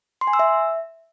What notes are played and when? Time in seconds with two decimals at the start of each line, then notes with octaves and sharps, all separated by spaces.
0.21 C6
0.27 G#5
0.33 E6
0.39 E5